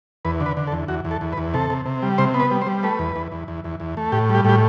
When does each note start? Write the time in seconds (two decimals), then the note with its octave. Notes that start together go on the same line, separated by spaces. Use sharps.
0.25 E2 B4
0.40 D3
0.46 B4
0.57 D3
0.67 A4
0.72 E2
0.88 E2 F#4
1.05 E2
1.11 A4
1.21 E2
1.33 B4
1.38 E2
1.54 C3 A4
1.70 C3
1.85 C3
2.02 G3
2.18 C3 C5
2.34 B3
2.40 B4
2.51 G3
2.62 C5
2.66 G3
2.83 A3 B4
2.99 E2
3.16 E2
3.32 E2
3.48 E2
3.64 E2
3.80 E2
3.97 A3
4.12 A2 G4
4.29 G3
4.34 G4
4.45 A2 G4